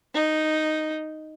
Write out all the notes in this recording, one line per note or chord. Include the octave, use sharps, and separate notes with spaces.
D#4